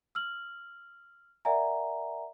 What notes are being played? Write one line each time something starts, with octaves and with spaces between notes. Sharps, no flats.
E6 F6 F#7
A#4 D5 E5 F#5 G#5 A#5